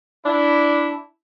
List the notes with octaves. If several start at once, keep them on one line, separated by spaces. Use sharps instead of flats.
D4 E4